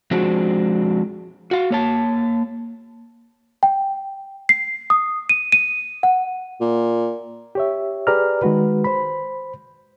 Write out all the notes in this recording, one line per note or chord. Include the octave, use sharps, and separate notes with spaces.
F3 G#3 C4 D4 F#4
F#4 F5
A#3 C#5 A5
G5
C7
D#6
D#7
D#7
F#5
A#2
G4 C#5 E5
G4 G#4 B4 D5 A#5 F6
D#3 G#3 F#4 B4
C5 B5